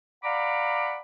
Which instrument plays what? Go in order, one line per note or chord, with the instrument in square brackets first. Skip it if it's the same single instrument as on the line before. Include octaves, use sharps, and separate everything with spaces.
[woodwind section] D5 F5 F#5 A#5 B5 D6